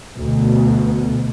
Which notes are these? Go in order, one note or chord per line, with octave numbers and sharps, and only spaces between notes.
D2 B2